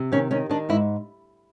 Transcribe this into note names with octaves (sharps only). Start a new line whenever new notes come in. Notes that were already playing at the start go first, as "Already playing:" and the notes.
Already playing: C3
D#3 C#4
D#3 C#4
D#3 D4
G#2 E4